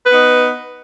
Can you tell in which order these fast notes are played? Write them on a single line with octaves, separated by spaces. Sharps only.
B4 B3 D#4